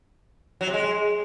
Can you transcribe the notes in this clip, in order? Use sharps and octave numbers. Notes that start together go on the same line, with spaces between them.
F#3
C3
G#3